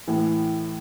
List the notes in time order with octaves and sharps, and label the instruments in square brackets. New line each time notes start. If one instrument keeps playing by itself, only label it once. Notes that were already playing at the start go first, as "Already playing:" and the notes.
[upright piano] A2 E3